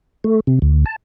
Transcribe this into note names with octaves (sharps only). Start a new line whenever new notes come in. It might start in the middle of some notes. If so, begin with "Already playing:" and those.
A3
C3
D2
A5